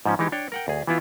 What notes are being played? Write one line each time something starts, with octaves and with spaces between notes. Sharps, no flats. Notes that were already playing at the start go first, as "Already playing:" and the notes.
G#2 F3 C#4
E3 G#3 D#4 G4
D4 C#5 G5
A#4 F#5 G5
D2 G#4
E3 B3 E4 F4